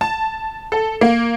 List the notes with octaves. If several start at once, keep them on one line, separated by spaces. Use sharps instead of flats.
A5
A4
A#3